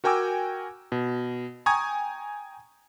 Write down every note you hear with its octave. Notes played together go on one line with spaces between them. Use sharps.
F#4 A#4 G5 G#5 D6 E6
B2
G5 G#5 A#5 C#6 D#6 G#6